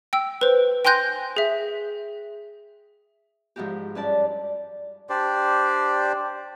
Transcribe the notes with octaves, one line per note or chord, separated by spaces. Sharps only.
G5 E6
B4 C5
G5 G#5 C6 F#6 G6 A#6
G#4 E5
G#2 F3 E4 F#4 G4
G2 C#4 E4 D5 A5
D4 G4 C5 D5